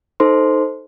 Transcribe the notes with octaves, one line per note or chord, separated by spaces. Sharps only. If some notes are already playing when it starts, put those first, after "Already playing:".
D#4 A4 C5 C6